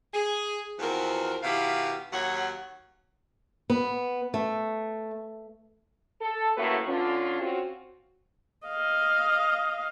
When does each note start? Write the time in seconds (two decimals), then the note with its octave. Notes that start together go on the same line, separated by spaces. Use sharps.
0.13 G#4
0.79 E2 F3 B3 C4 F#4 A#4
1.43 B2 D#3 E4 G4 F5 F#5
2.12 D#2 F#3 F#4 C#5 F#5
3.70 B3
4.34 A3
6.21 A4
6.57 F#2 A2 A3 A#3 F#4 B4
6.88 D3 C#4 F4
7.41 C4 C#4 F4 F#4
8.67 D#5 F5